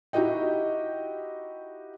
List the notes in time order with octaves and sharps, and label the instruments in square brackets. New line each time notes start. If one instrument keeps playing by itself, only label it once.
[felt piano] D#4 E4 F#4 G4 D#5 G5